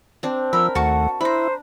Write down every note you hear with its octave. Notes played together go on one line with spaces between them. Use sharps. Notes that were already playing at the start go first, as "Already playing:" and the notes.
C4 D4
F3 A#4 B5 E6
D#2 A3 F#4 F#5 A5 C#6
D4 E4 C5 A#5 B5